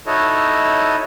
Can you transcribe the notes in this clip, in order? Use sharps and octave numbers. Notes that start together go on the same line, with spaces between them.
D#4 E4 F#4 A4 C#5 D#5